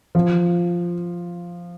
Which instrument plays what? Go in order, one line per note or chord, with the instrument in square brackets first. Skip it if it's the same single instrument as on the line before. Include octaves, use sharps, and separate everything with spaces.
[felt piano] F3